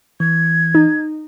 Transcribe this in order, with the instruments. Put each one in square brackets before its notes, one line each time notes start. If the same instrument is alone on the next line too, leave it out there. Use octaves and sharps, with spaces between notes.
[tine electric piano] E3 [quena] G#6
[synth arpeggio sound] D#4